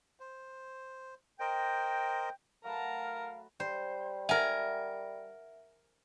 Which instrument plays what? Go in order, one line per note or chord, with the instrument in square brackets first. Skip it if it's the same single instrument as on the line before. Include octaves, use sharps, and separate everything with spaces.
[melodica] C5
[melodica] A#4 C5 D#5 [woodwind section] G5
[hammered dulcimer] F#3 A3 B4 [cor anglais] A#4 [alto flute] F5 [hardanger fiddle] A5 A#5
[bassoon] G3 [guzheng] C5
[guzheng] A#4 G#5 [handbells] E5 F#5